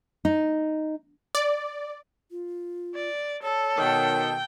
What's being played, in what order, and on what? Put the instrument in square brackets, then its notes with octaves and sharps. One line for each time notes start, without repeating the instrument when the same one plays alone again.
[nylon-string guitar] D#4
[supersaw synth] D5
[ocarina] F4
[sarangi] D5
[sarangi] A4 [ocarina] C#5
[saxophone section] B2 D#3 [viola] G5